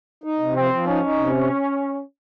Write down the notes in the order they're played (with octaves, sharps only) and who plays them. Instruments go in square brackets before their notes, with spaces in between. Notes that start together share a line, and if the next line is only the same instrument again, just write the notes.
[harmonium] D#4
C3
[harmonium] F3 [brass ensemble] C4
[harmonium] F3
[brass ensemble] C#4 [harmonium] D#4
[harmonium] D#4
C3